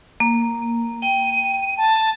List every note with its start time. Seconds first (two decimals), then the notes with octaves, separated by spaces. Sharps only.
0.20 A#3
1.02 G5 D#7
1.77 A5